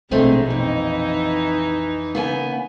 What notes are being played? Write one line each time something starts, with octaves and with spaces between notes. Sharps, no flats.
A#1 B2 D3 G#3 A3 C4 D#4
F2 E3 D#4
C#3 A#3 B3 G#5